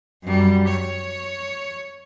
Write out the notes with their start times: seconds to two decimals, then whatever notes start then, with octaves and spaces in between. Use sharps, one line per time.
0.24 F#2 G3
0.69 C#5